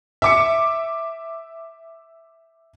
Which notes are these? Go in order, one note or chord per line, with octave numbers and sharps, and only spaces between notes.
E5 D6 C#7